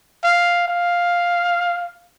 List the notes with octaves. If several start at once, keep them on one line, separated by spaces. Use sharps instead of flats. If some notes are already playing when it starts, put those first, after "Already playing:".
F5
F5